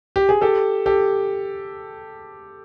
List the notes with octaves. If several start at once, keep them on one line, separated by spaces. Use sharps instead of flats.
G4
G#4
G4 A4
G4 A4